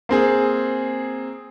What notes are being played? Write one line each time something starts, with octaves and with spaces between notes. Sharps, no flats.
A#3 C4 G#4